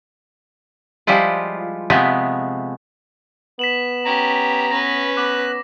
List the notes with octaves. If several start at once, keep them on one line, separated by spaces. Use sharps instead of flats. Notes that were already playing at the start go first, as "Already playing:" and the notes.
F3 G3 G#3 E4 F4
C3 F3 G#3 A3 B3
B3 B6 E7 F#7
C#4 G4 A#5
C#4 B4 A#6
B3 D6 F#6